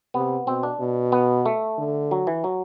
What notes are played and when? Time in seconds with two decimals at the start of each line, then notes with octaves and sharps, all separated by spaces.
0.14 C3 B3
0.47 B2 C4
0.63 D4
0.80 B2
1.12 B3
1.46 A3
1.78 D3
2.11 F#3
2.27 E3
2.44 F#3